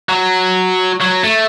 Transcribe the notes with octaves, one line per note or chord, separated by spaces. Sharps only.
F#3
F#3
A3